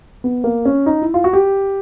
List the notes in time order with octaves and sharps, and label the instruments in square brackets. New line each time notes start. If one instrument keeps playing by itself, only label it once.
[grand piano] B3
A#3
C#4
D#4
E4
F4
F#4
G4